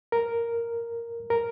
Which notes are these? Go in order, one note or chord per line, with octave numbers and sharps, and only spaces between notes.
A#4
A#4